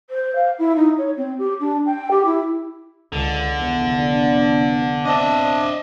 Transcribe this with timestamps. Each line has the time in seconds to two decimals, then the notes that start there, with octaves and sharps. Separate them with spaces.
0.10 C5
0.36 F5
0.59 E4
0.76 D#4
0.98 C#5
1.17 C4
1.38 G4
1.60 D4
1.86 G5
2.11 G4
2.25 E4
3.13 C#2 D3
3.56 F1 E2 B3
3.98 D4
5.05 C4 D4 D#5 E5